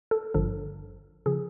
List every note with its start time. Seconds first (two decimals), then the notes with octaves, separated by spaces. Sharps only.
0.11 A4
0.34 G#1 G2 D3 F3 A4
1.26 C#3 F3 G#4